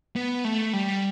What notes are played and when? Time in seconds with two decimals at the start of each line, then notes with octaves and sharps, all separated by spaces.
0.16 B3
0.45 A3
0.73 G3